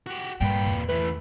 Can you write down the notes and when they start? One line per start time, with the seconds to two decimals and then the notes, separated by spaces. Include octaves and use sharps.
0.06 F#4 G4
0.41 G2 A#2 B4 G5
0.66 E2
0.89 E3 A3 B4